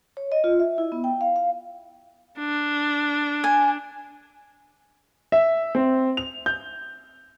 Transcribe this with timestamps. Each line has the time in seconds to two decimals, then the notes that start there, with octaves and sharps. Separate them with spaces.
0.17 C#5
0.32 D#5
0.44 F4
0.60 E5
0.78 E4
0.92 B3
1.04 G5
1.21 F5
1.36 F5
2.39 D4
3.44 G#5
5.32 E5
5.75 C4
6.17 F7
6.46 G6